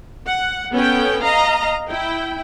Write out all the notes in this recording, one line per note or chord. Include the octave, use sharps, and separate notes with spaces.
F#5
B3 C#4 A4 G5
D#5 F5 A#5
E4 G5